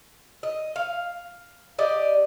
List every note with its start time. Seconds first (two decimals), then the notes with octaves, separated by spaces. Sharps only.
0.43 D#5
0.76 F5
1.79 G4 D5 D#5